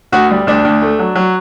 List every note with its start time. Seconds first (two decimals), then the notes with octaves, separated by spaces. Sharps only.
0.12 D2 F#4
0.31 G3
0.47 D2 D4
0.65 D2
0.82 A3
0.99 F#3
1.15 F#3